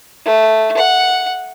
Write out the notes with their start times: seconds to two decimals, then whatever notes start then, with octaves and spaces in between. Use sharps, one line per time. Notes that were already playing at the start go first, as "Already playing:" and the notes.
0.25 A3
0.77 F#5